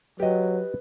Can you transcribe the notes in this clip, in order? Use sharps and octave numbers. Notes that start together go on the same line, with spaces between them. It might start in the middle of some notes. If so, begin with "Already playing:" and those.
F#3 G4 B4 D#5